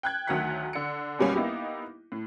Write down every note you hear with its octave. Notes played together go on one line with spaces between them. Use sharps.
G5 F#6 G#6
D2 D#3 F#3 F#5 F#6 B6
D3 C#7
F#2 B2 G3 A#3 C#4
A#3 B3 D#4 E4 G4
A2